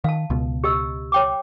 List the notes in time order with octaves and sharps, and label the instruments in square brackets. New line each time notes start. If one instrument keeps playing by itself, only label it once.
[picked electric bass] D#3 [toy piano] F5 A5
[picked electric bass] C#2 B2
[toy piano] G4 D#5 E6
C#5 G5 D6